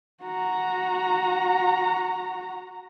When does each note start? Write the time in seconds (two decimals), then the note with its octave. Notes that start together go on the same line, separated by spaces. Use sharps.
0.23 F#4 A#5